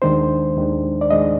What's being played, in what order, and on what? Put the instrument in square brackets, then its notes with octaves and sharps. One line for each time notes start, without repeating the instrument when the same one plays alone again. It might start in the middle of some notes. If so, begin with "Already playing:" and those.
[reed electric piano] D#2 D#3 G#3 D4 C5
D#2 D#3 G#3 D4
D5
D#2 D#3 G#3 D4 D#5